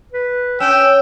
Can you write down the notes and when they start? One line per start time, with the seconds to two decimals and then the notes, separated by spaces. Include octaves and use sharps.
0.12 B4
0.60 C#4 G5 E6